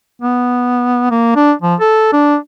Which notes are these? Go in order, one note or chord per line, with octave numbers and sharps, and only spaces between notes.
B3
A#3
D4
F3
A4
D4